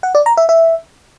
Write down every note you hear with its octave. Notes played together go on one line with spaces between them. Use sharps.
F#5
D5
A#5
E5
E5